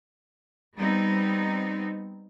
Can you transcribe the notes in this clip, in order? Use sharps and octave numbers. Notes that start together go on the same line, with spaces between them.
G3 B3 C4 D#4